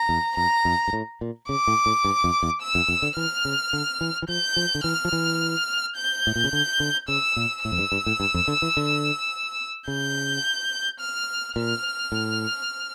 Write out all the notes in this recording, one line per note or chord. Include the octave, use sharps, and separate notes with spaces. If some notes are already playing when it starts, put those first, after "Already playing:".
Already playing: A#5
E2
F2 A#5
F2
G2
A2
A#2
C#3 D6
A2
A2
G2
F2
E2
E6
F2
F2
D3
E3 F6
C#3
D3
E3
E3
F3 G6
F3
D3
E3 F6
F3
E3
G6
A2
A#2
C#3
D3
D3
C#3 E6
A#2
A2 E6
F2
G2
G2
A2
G2
F2
D3
E3
D3
C#3 G6
F6
A#2 F6
A2